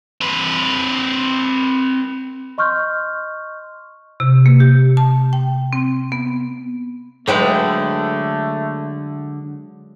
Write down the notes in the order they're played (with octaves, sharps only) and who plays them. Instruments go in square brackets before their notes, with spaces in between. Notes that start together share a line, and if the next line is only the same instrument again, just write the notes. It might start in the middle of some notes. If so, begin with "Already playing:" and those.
[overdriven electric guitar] C4 B4
[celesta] D#5 C6 C#6 F6 G6
[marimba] C3
A#3
G4
A5
G5
C4
B3
[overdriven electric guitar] D3 [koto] F#3 G#3 B4 [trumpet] A3 [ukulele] C5 G5